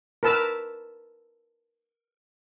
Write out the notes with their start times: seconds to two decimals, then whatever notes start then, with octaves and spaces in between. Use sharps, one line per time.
0.23 A#4 B4 A5 E6